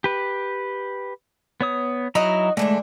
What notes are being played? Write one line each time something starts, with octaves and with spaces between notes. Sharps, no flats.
G4 B4
B3 C#5 D#6
F#3 D#4 E4 F#4 D#5 A#5
D3 E3 G#3 A3 D4